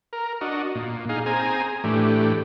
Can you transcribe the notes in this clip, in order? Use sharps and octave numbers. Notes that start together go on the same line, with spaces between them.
A#4
D4 F#4 D#5
A#2
D#4 G#4 F5
C4 G#4 G#5 A#5
A2 E3 A3 D4 G4